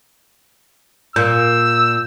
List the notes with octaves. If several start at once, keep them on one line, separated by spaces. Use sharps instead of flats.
A#2 E6 G6